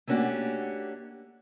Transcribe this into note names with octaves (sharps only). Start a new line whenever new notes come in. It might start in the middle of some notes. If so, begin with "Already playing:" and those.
A3 A#3 C#4 D4 F#4 G4